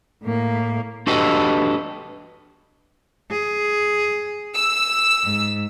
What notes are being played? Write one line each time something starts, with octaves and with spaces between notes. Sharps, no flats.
A2 A#3
D4 F#4 G4 A4 B4 D#5
G#4
E6
G#2